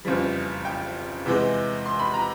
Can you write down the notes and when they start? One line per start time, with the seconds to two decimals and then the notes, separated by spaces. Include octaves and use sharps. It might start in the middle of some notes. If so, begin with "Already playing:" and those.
0.05 F#1 F2 C#3 E3 G3
0.65 G5
1.26 E2 C3 E3 G#3
1.86 C6
2.00 B5
2.14 A#5